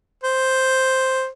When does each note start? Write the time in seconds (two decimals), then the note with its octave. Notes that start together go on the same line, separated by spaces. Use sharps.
0.23 C5